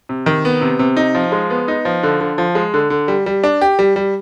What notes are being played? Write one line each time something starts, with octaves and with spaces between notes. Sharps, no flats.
C3
D#3
B3
C3
C3
D#4
F3
G#3
B3
D#4
F3
D3
D3
F3
G#3
D3
D3
G3
G3
D4
G4
G3
G3